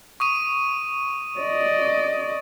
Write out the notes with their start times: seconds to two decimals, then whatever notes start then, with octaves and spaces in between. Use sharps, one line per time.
0.20 C#6 D#6 D#7
1.40 D5 D#5